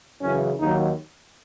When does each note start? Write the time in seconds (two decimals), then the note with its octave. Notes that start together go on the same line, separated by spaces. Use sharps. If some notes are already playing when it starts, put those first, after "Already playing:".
0.20 F#2 C#3 E3 C#4
0.58 D#2 D#3 F#3 D#4